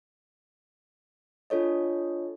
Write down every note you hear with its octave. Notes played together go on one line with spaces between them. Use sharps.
D4 F4 A4 C#5 D#5